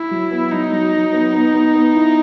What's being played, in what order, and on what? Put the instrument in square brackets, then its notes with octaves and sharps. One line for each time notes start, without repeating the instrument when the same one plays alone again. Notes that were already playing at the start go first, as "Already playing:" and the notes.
Already playing: [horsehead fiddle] E4
[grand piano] F#3
B3
[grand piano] F#3 [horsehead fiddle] D#4
[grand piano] F#3
F#3
B3
B3
B3
B3
E4